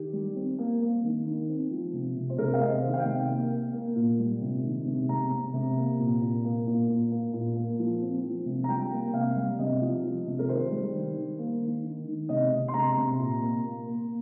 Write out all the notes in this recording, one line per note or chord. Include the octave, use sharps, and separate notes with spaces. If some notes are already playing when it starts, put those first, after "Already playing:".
Already playing: D#3 G4
G3
C4
A#3
A#3
D#3
D#3
C4
F3
C3
C3
C5
C3 A#4
F5
C3 D#5
C5
D#3
F5
G5
C3
A#3
A#3
A#3
A#2
G3
C3
D#3
C3
C3 A#5
C3
C3
A#3
A#2
A#2
A#3
A#2
A#2
A#3
A#2
A#3
F3
C4
F3
C3
A#5
G3 G5
A#3
C3 F5
G3
C3 D#5
F3
F3
C3
A#4
D#3 C5
G3
D#3
D#3
A#3
D#3
D#3
D#3
C3 D#5
C3
C6
C3 A#5
C3
A#2
A#3
A#3
A#3